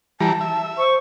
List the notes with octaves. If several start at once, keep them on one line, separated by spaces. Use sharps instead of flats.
E3 G3 A5 A#5
E5
C5 C#6